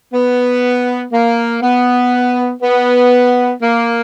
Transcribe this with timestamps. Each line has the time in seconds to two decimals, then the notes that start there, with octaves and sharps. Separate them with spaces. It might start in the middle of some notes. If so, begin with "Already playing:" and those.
0.14 B3
1.13 A#3
1.62 B3
2.62 B3
3.62 A#3